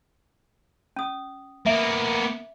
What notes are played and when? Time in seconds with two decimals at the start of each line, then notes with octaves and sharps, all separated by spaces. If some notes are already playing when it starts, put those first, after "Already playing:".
0.96 C#4 D#6
1.66 A#3 B3 E5